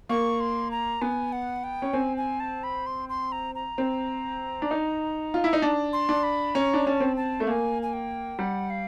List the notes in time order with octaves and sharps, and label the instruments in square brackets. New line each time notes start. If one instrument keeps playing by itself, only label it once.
[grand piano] A#3 [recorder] C#6
[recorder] C6
A#5
[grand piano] B3 [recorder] G#5
[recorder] F#5
G5
[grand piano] C#4
[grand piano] C4 [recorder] G#5
[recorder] G#5
A5
B5
C6
C6
A#5
A#5
[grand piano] C4
D4
D#4
F4
E4
D#4
D4
[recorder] C6
[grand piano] D4
[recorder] B5
[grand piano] C#4 [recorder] A#5
[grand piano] D4
[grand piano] C#4 [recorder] A5
[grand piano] C4
[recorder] A5
[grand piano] A3
[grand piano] A#3 [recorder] G#5 A5
[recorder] G#5
G5
[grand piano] G3 [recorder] F#5
[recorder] F5